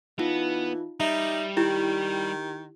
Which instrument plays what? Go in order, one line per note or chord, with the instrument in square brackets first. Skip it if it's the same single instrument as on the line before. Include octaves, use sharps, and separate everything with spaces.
[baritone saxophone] E3 [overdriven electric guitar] B3 [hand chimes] D#4 F4
[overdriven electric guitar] G3 [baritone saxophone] D#4 [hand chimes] E5
[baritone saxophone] D#3 [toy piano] E4 [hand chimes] G4